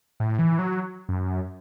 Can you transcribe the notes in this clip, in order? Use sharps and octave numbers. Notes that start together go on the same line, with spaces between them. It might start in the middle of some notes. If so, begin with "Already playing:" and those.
A2
E3
F#3
F#2